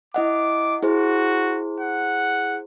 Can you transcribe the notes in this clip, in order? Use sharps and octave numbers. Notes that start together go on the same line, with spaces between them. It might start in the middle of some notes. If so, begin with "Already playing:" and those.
E4 D#5 F#5 D6
E4 F#4 G#4 C5
F#5